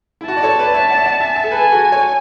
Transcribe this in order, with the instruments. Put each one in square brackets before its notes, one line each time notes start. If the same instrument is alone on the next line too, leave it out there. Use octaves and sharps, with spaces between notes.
[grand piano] E4
[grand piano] F#4 [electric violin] A5
[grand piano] D5
A4 C#5
B4 D5
C#5 E5
D5 F#5
E5
D5 F#5
E5 G#5
E5 G#5
A4
[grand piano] G#4 B4 [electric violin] G#5
[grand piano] F#4 A4
A4 C#5